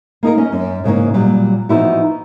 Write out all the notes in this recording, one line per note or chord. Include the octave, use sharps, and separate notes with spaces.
A#3 D#4 G#4 A#4
C#4 D#5
F#2
G#2 C#3 E3 A#3
A#2 F#3 G3
E3 F3 B3 D#4 E4 F#4